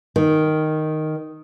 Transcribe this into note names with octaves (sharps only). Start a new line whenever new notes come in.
D#3